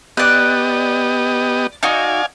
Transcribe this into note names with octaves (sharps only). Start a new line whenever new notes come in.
B3 G4 D5 D#5 F#6
D#4 F#4 D5 F5 G#5